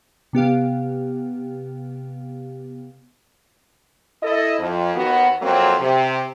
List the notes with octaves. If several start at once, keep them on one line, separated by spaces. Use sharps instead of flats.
C3 B3 G4 F5
E4 A4 D#5
F2
D#2 D#3 B3 F#4
F2 F#3 A#3 C4
C3